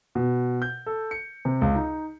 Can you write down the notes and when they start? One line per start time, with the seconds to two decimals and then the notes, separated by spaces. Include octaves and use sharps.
0.15 B2
0.62 G6
0.86 A4
1.11 C#7
1.45 C3
1.61 C#2
1.75 D#4